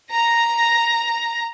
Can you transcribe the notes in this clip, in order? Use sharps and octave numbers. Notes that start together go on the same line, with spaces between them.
A#5 A#6